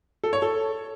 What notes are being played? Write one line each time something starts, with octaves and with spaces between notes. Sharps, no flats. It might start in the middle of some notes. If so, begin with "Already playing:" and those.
A4
C#5
A4